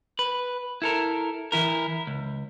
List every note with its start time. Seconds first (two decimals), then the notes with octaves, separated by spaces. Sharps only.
0.19 B4
0.82 E4 A4 A#4
1.52 E3 E4 A#4
2.07 C#2